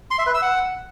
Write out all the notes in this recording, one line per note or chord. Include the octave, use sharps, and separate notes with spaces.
C6
E5
B4
E6
F#5